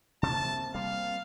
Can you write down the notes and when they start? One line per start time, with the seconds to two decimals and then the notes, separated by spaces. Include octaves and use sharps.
0.23 C3 A#3 A5
0.75 G3 A#3 C4 F5